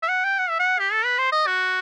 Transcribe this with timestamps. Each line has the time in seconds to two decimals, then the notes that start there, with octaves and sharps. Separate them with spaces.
0.03 E5
0.09 F#5
0.24 G5
0.39 F#5
0.50 E5
0.60 F#5
0.79 G4
0.93 A4
1.05 B4
1.18 C5
1.32 D#5
1.47 F#4